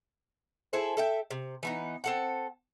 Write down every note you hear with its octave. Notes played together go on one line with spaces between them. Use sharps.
E4 G#4 A4 C5
A4 E5 G5
C3
E3 B3 D#4
C4 A4 F#5